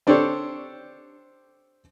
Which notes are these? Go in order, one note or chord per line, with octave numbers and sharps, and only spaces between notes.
C4 D4 G4 A4 C5 C#5